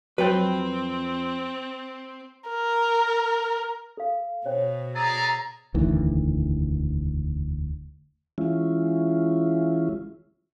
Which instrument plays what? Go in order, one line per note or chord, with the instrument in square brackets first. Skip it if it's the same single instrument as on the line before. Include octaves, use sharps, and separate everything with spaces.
[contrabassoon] F2 [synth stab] F#3 [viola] C4 [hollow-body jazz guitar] B4 G5
[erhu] A#4
[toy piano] A4 F5
[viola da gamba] B2 [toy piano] C5 C#5 G5
[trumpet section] G#4 A4 D5 [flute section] A#5
[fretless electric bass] E1 D2 D#3 E3
[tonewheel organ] E3 G#3 C#4 E4 F4